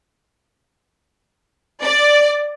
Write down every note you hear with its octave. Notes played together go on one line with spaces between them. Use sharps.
D5